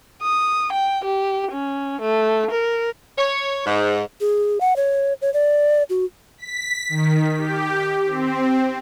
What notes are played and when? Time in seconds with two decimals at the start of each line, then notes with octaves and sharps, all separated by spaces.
0.22 D#6
0.73 G5
1.05 G4
1.52 C#4
2.01 A3
2.51 A#4
3.18 C#5
3.66 G#2
4.21 G#4
4.61 F#5
4.76 C#5
5.22 C#5
5.34 D5
5.90 F#4
6.38 B6
6.89 D#3
7.38 G4
8.07 C4